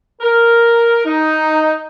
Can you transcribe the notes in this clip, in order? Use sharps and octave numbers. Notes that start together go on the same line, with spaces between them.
A#4
D#4